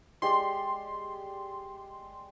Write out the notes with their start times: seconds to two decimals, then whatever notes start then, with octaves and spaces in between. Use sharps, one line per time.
0.22 G#3 G4 D5 C6